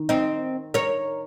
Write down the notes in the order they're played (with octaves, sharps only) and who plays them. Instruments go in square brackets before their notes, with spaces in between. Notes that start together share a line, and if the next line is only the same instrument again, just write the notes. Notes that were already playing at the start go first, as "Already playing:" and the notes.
Already playing: [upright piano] D#3
[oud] C4 D#4
A#4 C#5